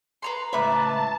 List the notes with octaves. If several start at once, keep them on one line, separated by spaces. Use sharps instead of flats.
B4 A#5 C6
C#2 A2 B4 E5 A5 A#5 D6 F#6